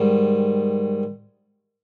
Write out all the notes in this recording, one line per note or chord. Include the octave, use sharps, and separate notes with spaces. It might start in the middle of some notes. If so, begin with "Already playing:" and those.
Already playing: G#2 D#3 G3